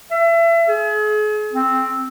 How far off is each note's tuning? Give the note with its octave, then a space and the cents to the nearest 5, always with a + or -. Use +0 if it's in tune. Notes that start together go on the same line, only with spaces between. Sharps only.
E5 +30
G#4 +40
C4 +5